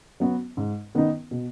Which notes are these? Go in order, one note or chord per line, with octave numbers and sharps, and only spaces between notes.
F#3 B3 F#4
G#2
D#3 B3 D#4
B2